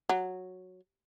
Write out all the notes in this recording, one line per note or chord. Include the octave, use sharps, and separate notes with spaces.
F#3